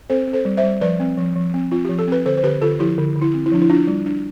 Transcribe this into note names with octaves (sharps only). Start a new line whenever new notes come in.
C4 A4 C5
C4
A4 C5
G3
C5 E5
G3
F3 B4 D5
C4
F3
F3
C4
C4 F4
F3 G4
A4
C4 B4
D3 A4 C5
C5
D3 G4 B4
D3 F4 A4
F3 E4 G4
D3
D3
E4
C4
E4
F3 D4
E4
D4 F4
G3
D4